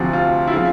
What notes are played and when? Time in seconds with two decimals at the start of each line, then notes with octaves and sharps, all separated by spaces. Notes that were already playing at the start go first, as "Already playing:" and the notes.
Already playing: D2 C3 F3 F#4
0.13 F4
0.47 E4
0.52 C#3 F3 F4